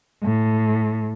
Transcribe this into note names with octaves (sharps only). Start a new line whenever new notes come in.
A2